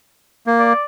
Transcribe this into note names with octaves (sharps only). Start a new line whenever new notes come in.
A#3
D5